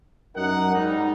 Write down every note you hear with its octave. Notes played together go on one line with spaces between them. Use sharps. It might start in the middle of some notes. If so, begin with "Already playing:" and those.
F#2 D#4 A#4 F#5
G#2 G3 D#4